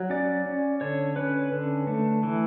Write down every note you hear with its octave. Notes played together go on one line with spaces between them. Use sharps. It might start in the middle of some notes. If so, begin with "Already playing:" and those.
Already playing: F#3
C#4 D5
C#4
D3 C#5
C#4 B4
D3
A3
E3